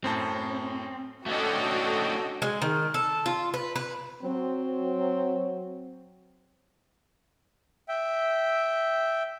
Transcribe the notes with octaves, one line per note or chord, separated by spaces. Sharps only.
F#2 A2 C4 A5
A3 C#4 D4 F#4 A4 D#5 G5
G#3
D#3
A4
F4
B4
B4
F#3 C4
E5 G5